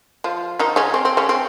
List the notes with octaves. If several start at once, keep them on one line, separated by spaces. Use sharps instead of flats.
F3 F4
D#3 D#4
C#3 C#4
C4
C4
C#3 C#4
C4